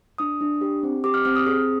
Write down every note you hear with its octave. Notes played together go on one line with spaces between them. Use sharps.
D4 D#6
D4
G4
C4
G4 D6
F6
C4 F6
D#6
G#4 D#6